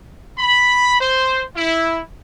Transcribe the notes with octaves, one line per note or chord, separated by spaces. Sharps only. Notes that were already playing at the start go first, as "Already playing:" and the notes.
B5
C5
E4